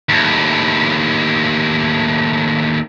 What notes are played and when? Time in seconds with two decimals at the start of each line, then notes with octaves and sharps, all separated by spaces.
0.09 D#2 A2